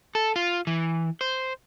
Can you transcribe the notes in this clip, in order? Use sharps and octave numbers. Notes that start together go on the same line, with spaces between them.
A4
F4
E3
C5